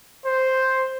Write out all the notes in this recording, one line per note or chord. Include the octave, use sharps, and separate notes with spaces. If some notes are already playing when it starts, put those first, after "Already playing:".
C5